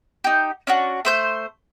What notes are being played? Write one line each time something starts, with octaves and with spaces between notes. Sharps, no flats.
D#4 G4
C#4 D4 F#4
A3 C5 G6